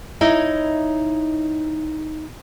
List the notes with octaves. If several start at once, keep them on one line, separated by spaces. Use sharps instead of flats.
D#4 E4 C#5 D#5